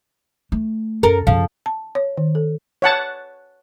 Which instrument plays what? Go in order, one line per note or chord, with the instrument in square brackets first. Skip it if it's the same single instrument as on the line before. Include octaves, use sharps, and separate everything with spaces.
[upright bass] A3
[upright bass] F#2 [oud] A4 A#4
[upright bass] F#2 C#3 [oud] F3
[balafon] A5
C#5
D#3
A4
[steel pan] C#5 F#5 A5